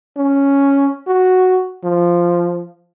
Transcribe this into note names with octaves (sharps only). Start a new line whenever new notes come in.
C#4
F#4
F3